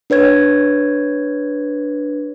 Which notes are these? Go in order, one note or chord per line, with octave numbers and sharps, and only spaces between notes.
D4 B4 C#5 G#6